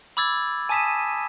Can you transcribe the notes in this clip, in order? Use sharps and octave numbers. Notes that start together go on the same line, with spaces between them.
B5 D6 E6 G#6 A6
G#5 A5 D#6 B6 D#7 E7